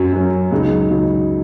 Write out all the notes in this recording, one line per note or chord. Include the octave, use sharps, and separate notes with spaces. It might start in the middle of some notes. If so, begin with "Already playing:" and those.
Already playing: F#2 F#3 C#4
F#2 F#3 C#4
C#2 C#3 F#3 D#4
C#2 C#3 F#3 D#4